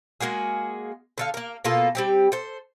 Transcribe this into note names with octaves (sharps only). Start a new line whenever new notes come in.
G#3 A#3 F#4 G#4
D3 A4 F5
A#3 A#4
B2 A#3 F4 A4
G3 C4 G4
A4 C5